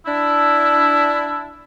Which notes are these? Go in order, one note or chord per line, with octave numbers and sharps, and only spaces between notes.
D4 E4